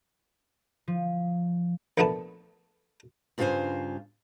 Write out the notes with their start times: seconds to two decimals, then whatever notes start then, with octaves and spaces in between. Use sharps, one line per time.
0.88 F3
1.98 A#1 D3 A3 B3 B4 A5
3.38 G2 C#3 F4 G4 C5 G#5